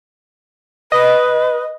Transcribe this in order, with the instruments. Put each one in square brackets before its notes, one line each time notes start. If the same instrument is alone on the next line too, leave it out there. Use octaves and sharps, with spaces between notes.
[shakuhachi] B4 [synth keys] D#5